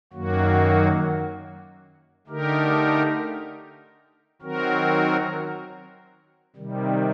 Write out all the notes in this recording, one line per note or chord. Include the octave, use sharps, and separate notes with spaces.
F#2 D#3 F#3 A#3 F#4
D3 A3 D#4 G4 A#4
D#3 F#3 C4 F#4 A#4
C3 D#3 G3